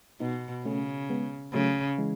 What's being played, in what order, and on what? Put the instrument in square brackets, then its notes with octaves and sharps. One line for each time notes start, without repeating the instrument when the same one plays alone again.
[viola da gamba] B2 [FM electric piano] B3 D#4
[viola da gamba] C#3 [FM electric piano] A3 C#4
[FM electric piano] G#3 B3
[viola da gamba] C#3 [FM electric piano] F#3 A3
[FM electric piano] E3 G#3